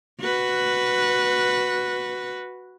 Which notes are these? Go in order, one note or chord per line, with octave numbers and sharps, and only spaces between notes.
F#4 B4